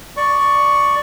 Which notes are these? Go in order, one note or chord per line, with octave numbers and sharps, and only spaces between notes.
D5 C#6